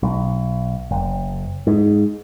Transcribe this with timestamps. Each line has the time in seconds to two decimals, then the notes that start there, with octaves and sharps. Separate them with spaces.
0.03 B1
0.91 F#1
1.67 G#2